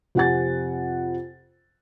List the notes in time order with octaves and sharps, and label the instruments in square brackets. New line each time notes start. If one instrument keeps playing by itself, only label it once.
[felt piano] F2 C3 F#5 G#5 A6